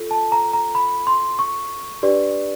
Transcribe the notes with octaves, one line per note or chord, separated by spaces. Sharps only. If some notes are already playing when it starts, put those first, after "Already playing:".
Already playing: F4 A4
A5
A#5
A#5
B5
C6
C#6
D4 G4 B4 D5